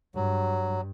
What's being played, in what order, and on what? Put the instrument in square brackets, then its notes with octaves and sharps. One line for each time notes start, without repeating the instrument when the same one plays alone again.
[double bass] G2 [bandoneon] F#3